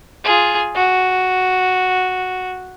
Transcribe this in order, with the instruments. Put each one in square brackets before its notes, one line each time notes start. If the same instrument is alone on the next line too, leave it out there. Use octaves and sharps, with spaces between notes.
[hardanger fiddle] F4 G#4
F#4